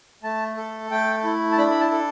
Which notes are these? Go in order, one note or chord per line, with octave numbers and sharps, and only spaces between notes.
A3 A5
A4
A3 G5
E4
A5
D4 B5
B5
A5
A4